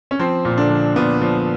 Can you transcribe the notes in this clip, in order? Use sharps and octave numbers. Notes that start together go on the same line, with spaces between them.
C#4
F3 C4
A#2
D3 D4
F3
A#2 B3
F3